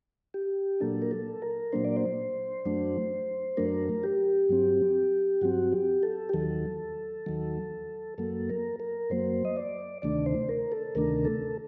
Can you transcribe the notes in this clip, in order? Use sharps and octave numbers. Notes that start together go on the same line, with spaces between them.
G4
A#2 F#3 A#3 D4 A4
A#4
A4
A#4
A#2 F#3 A#3 D4 C5
D5
C5
F#2 F#3 A3 D4
F#2 F#3 A3 D4 A#4
G4
G2 F#3 C4
G2 F#3 C4 F#4
G4
A4
G4
D#2 D#3 F#3 A4
D#2 D#3 F#3
F#2 F#3 A#3 A4
A#4
A#4
F#2 F#3 A#3 C5
D#5
D5
D2 C3 D#3 A3 D4 D5
C5
A#4
A4
D2 C3 D#3 A3 D4 A#4
A4